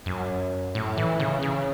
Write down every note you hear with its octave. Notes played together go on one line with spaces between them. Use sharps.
F#2
A2
E3
C#3
C#3